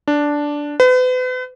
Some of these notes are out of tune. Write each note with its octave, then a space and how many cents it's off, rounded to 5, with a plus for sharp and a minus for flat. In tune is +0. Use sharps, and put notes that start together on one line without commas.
D4 -5
B4 +40